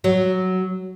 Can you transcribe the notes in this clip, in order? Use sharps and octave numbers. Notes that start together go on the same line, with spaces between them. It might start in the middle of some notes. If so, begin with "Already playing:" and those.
F#3